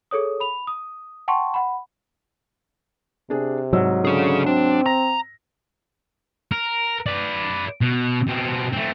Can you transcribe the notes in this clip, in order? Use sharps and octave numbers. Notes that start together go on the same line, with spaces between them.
G#4 A4 C#5 D#6
B5 F7
D#6
F#5 G5 A5 C6 C#6
F#5 B5
C3 D4 G#4
C2 G#2 F#3 E6
D3 C#4 G#4
C4 D4
A#5 A#6
A#4
B4 D5
B2
B2 C4
A3 C4